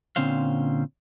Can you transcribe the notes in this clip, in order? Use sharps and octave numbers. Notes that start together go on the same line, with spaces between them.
A#2 D3 C4 C#4 C5 F5